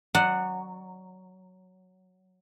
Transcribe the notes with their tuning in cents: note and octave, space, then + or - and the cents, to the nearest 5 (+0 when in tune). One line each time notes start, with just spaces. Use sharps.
F#3 +0 D5 +30 F#5 +0